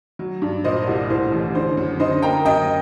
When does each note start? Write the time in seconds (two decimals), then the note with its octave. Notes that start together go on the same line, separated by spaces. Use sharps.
0.19 F#3
0.42 G2
0.64 A#2 C5 D#5
0.87 C2
1.10 A2 C5
1.32 A1
1.55 D3 C5
1.77 F#2
1.99 D3 C5 D#5
2.22 A#3 G5 A#5
2.45 F#2 D#5 G5